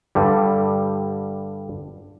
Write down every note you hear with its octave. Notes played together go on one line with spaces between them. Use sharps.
G2 D3 G3